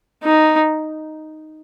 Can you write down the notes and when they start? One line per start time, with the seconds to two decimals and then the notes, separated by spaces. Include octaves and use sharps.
0.24 D#4